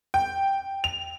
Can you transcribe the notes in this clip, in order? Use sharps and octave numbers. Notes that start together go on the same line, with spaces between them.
G5
F7